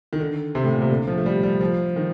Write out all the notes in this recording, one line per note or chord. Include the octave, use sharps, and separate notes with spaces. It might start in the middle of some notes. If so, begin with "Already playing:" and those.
D#3
D3
C3
A2
A#2
C3
D3
F3
A3
G3
G3
F3
D#3